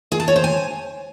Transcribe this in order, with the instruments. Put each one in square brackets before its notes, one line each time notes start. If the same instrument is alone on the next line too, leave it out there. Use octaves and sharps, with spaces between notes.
[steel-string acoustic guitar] G#4
A5
C#5
C5
G#5